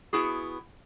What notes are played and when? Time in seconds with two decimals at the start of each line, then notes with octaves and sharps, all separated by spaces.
0.13 B3 E4 F#4 G#4